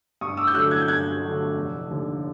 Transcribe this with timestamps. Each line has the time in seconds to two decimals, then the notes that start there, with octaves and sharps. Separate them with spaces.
0.21 G2 C#6 D#6
0.37 D6 E6
0.47 G6
0.54 D3 F#3 A3 E6 F#6
0.71 F#6 G#6
0.82 G6
0.88 G2 F#6 G#6
1.23 D3 F#3 A3
1.55 F1
1.90 D#2 D3